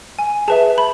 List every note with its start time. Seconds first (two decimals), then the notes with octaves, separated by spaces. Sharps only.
0.19 G#5
0.48 G#4 B4 E5 A5
0.78 B5